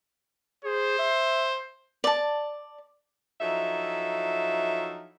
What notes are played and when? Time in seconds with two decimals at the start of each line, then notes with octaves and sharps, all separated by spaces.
0.65 G#4 C5
0.99 E5
2.04 D5 A5
3.40 F3 F#3 D#4 E4 A4 E5